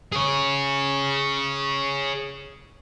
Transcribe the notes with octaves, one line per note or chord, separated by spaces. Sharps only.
G#4 C#5